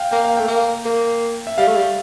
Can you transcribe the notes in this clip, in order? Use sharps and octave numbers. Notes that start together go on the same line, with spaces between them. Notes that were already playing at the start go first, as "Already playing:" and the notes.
Already playing: F5 G5
A#3 G5
F5
A3 G5
A#3
A#3
E5
G3 F5
A3
G3